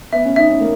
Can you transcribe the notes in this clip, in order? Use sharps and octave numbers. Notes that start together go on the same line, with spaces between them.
B3 E5
C#4
D#4 E5
C#4
A#3